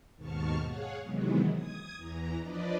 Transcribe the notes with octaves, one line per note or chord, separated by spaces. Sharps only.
D#2 G#2 B2 A5 C#6 F6
G#4 C#5 F5 F#5
C3 D#3 E3 F#3 G#3 B3
D#6 G#6
E2 E3 A#5
F3 D4 B4 D5 D#5